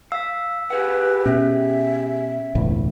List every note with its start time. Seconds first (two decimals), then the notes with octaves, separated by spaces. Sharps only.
0.12 F5 E6 B6
0.70 G4 G#4 B4 F#5
1.26 B2 C#4 E5
2.55 E1 C#2 A2